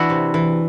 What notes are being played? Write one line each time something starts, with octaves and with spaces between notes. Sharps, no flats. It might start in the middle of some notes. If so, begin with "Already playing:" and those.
Already playing: E3 D4 E4 F#4
C3
E3